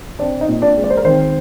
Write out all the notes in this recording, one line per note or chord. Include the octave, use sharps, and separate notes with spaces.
C4 D4 D5
D#4 D#5
A#2
D4 D5
G#3
D5
C5
A#4
D#3 C4 C5